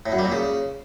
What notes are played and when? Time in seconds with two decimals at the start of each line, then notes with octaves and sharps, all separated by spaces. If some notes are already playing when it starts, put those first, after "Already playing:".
0.06 A2
0.12 F#2
0.19 G3
0.25 A#2
0.32 C#3